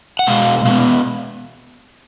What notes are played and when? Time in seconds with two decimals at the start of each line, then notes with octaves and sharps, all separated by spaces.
0.19 F#5
0.27 B2 G#3 F5
0.65 B2 G#3 B3 F5